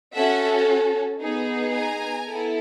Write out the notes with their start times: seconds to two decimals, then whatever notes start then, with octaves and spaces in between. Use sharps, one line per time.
0.14 C#4 F#4 A4 E5 F#5
1.21 B3 D#4 G#4
1.74 G#5 A#5
2.27 B3 E4 A4